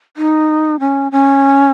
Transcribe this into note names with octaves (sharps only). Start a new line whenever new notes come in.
D#4
C#4
C#4